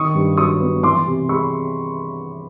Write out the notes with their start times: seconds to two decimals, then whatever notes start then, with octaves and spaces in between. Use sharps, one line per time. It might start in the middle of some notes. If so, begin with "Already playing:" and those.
Already playing: D#3 C#6 D#6
0.15 G2
0.37 F#3 C#6 D#6
0.60 B3
0.83 E3 C6 D6
1.06 C3
1.29 G#3 B5 C#6